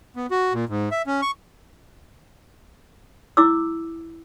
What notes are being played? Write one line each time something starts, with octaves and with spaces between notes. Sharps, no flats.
B3
F#4
A#2
G#2
E5
C#4
C#6
E4 D6 E6